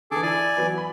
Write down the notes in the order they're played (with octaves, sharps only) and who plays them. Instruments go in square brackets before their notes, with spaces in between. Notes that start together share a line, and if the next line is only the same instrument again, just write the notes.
[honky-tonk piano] D3 E3 [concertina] G#4 A4 D6
[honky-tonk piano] E4 [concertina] D5 G#5
[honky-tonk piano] E3 F#3 B3
B5